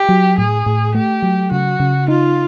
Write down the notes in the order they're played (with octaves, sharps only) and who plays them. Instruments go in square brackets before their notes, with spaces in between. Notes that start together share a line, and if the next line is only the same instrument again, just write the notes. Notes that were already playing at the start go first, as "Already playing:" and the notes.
Already playing: [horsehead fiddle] G4
[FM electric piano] F#3
[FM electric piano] A2 [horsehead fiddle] G#4
[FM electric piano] A2
[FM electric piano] A3 [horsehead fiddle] G4
[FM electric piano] F#3
[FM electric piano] C#3 [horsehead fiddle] F#4
[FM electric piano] C#3
[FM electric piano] D#4 [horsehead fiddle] F4